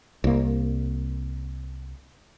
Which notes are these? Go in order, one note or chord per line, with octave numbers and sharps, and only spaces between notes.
C2 A#3